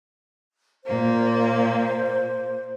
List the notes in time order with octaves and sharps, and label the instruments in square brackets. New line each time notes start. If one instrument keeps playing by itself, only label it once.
[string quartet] A#2 A#3 [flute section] C5